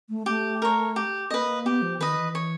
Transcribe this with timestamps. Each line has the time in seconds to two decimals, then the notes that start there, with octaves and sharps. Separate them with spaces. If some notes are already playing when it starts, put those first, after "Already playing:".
0.09 A3
0.26 A3 G4
0.62 A#4 C#5
0.96 G4
1.30 A#3 B4 D#5
1.65 B3 G4
1.82 F3
2.00 D#3 B4 D#5
2.18 E3
2.35 C#5